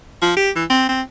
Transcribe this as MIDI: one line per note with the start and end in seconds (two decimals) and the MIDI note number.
0.22 0.32 53
0.37 0.50 67
0.55 0.64 52
0.70 0.88 60
0.89 1.01 60